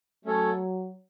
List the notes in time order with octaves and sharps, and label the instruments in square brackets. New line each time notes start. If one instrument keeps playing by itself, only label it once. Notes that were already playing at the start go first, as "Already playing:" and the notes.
[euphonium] F#3 [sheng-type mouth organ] A3 C#4 A4 C#5